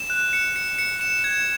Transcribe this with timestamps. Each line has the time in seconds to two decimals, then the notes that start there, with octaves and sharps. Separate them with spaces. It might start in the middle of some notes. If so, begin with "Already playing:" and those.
Already playing: E7
0.10 F#6
0.33 C#7
0.56 C#7
0.78 C#7
1.01 E7
1.24 G#6